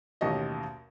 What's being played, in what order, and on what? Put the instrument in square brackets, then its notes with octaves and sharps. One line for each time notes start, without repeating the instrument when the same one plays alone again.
[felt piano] A1 D#2 B2 G4 C#5 D#5